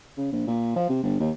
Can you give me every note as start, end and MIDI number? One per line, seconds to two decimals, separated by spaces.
0.18 0.28 49
0.32 0.43 34
0.47 0.75 46
0.76 0.85 53
0.89 1.02 48
1.03 1.18 31
1.20 1.31 39